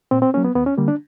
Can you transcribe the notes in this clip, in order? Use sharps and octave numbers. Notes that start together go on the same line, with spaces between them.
A#2 C4
C4
F#3 A#3 C#4
B3
D#2 B3
C#4
D3 G3 A#3
D4